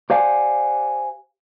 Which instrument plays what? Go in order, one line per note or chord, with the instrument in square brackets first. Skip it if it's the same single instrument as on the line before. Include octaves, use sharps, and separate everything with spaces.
[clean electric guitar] G4 C5 D5 F5 F#5 G#5